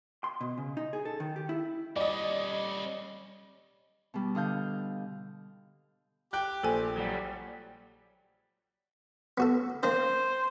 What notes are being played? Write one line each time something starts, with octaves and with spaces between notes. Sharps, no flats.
C6
B2
C#3
D#4
G#4
A4
D#3
G4
E4
G3 C#4 D5 D#5
B2 G3
D3 D#5 F5 G6
G4 G5 F#6
A#1 A4 C5 G#5
F#3 G3
B3 F#4 A4
A#3 D4 C5